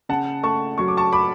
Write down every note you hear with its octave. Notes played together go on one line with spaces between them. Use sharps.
C#3 F#5 A5
A3 A5 C#6
F#3 C#6
D6
A5 C#6
B5 D6